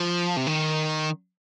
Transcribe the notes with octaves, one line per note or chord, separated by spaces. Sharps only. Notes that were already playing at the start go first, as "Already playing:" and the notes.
Already playing: F3
C3
D#3